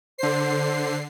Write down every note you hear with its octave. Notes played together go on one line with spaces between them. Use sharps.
D3 C5 C7